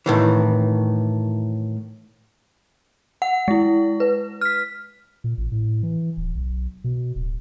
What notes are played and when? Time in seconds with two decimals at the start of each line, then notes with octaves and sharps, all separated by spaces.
0.06 A2 D#3 E3
3.22 F#5
3.48 G#3 E4
4.00 B4
4.41 F6 B6
5.24 A#2
5.38 A1
5.52 A2
5.83 E3
6.17 D1
6.35 B1
6.84 B2
7.16 D1